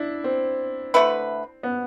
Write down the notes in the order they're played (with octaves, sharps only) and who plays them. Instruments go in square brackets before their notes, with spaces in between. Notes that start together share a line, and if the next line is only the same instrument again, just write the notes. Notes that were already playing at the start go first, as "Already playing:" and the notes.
Already playing: [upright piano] D4 E4
C4
[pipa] D3 A3 E4 B4
[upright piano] B3